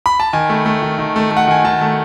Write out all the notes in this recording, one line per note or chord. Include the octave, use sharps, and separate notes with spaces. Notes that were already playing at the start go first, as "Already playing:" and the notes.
B5
A5
D#3 G#5
A3
A3
D#3
D#3
A3
A3
F#5
D#3 G#5
D#3 A5
A3